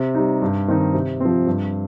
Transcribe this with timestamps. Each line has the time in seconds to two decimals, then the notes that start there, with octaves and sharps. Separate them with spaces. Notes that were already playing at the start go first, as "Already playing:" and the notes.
Already playing: C3
0.15 G3 D#4
0.42 G2
0.68 D#3 C4 D#4
0.94 C3
1.20 F3 C4
1.47 G2